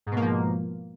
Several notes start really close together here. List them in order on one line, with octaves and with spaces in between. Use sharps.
G#2 B2 A#3 F3